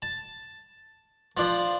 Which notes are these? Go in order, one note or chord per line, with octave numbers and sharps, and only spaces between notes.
A5
F3 D4 C5